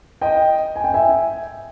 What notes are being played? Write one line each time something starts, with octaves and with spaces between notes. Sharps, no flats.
D#5 G5
G#5
G5
E5 G#5